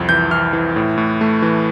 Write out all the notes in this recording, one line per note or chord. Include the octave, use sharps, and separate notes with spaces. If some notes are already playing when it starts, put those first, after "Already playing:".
Already playing: C2 F2
E3 G6
E3 F6
E3
A2
A2
A3
E3